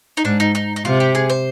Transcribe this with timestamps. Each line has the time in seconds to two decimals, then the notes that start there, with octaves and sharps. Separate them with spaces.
0.17 D#4
0.25 G#2 D4
0.40 D#4
0.55 D#4
0.76 D#4
0.85 C3 F4
1.00 G4
1.15 G#4
1.30 C5